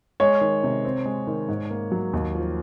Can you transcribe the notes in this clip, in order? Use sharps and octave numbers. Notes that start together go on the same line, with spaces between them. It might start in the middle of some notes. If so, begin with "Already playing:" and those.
G#3 C#5
D#3
C3
C4
G#3
D#3
G#2
A#3
F#3
D#2
F3